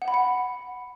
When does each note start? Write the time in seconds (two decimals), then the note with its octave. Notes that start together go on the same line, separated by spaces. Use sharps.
0.02 F#5
0.08 B5
0.14 F#5